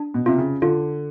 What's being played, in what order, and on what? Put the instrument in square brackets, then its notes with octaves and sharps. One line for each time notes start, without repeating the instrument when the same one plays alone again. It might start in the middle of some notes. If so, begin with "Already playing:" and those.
Already playing: [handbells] D4
[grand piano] B2
[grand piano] C3 [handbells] F4
[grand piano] C#3
[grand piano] D3 [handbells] F4